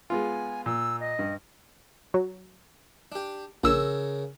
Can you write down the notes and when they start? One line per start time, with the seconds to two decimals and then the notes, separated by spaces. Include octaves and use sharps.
0.10 G#3 B3 F4 G#5
0.66 A#2 E6
1.00 D#5
1.19 G2
2.14 F#3
3.12 D4 G4
3.64 A#1 C#3 A#4 C#5 E6